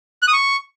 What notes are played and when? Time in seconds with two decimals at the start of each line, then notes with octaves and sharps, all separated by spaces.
0.22 F#6
0.28 D#6
0.33 C#6